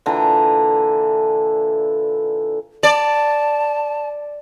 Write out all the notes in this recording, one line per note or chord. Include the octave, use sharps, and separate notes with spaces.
A#2 D3 E3 A#5
D5 A5